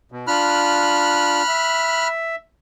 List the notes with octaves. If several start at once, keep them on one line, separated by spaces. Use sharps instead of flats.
B2
D4 F4 B5 F6 F#6
E5